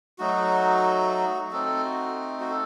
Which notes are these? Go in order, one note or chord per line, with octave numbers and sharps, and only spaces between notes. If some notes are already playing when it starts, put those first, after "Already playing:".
F#3 A3 D#4 F#4
A3 C4 D#4 A4
F#4
F#4
A4